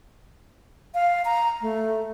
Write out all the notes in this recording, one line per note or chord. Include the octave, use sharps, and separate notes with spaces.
F5
A#5
A3